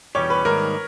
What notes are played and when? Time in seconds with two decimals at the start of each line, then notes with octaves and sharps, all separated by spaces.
0.15 E2 B2 G3 C#4 G4 C#5
0.30 B4
0.45 G#2 D#3 G3 A#3 A#4